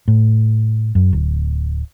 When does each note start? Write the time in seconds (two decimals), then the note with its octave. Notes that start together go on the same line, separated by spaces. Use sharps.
0.08 A2
0.95 F#2
1.13 D1